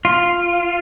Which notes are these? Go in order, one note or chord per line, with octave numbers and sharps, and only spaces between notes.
F4